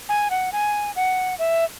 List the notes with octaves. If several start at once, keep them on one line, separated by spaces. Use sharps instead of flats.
G#5
F#5
G#5
F#5
E5